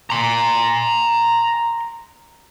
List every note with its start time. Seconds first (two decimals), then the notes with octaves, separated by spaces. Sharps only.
0.10 A#5 C6